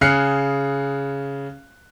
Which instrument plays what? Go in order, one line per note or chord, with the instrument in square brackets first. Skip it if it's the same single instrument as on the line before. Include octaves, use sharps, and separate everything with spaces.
[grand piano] C#3 G#4 F6 F#6 C7 C#7